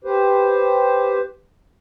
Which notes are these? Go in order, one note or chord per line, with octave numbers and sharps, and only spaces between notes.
G4 B4 C5